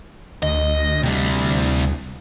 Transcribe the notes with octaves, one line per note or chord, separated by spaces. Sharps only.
D2 D#5
C3 G3